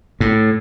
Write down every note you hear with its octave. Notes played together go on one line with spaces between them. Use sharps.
A2